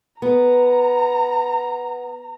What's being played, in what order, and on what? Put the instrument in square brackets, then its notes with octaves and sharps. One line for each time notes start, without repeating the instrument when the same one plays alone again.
[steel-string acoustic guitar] B3 [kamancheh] A#5